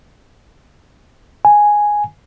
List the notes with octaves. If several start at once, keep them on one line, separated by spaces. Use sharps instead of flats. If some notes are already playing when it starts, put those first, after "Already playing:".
G#5